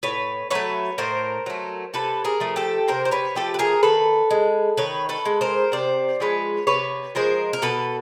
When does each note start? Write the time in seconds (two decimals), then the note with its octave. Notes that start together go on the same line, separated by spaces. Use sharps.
0.03 A2 B4 C#5
0.51 F#3 A3 B4 C#5
0.98 A2 A#4 C5
1.46 F#3 A3
1.94 C3 A4 B4
2.25 G#4 A#4
2.40 F3 A3
2.56 G4 A4
2.88 C3 A#4 C5
3.05 C5
3.11 B4 C#5
3.35 F3 A3 G4 A4
3.54 B4
3.59 G#4 A#4
3.83 D#3 A4 B4
4.31 G#3
4.77 D#3 B4 C#5
5.09 A4 B4
5.25 G#3
5.41 A#4 C5
5.72 C3 C5 D5
6.20 F3 G#3 B4 C#5
6.67 C3 B4 C#5
7.15 F3 G#3 A#4 C5
7.53 A#4
7.62 B2 A4 B4